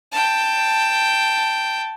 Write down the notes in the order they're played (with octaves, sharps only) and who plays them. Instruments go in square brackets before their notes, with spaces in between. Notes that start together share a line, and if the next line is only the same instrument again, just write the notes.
[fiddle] G5 A5